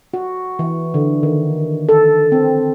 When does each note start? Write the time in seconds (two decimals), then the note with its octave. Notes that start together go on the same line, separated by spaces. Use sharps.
0.14 F#4
0.59 E3
0.94 D3
1.23 D#3
1.89 A4
2.32 C4